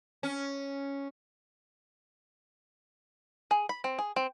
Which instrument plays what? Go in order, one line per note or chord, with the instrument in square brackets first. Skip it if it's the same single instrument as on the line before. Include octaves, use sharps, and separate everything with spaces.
[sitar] C#4
[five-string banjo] G#4
B5
C4
G#4
C4